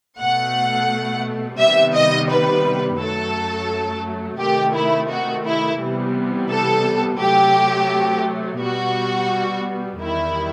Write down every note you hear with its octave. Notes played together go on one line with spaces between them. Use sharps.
B2 A3 F#5
C3 D#3 G3 B3 E5
D#5
B4
F#2 F#3 A3 A4
C3 D#3 A3 G4
E4
F#4
E4
C3 E3 G3 B3
A4
C3 F#3 A3 G4
B2 G3 B3 F#4
E2 D#3 G3 E4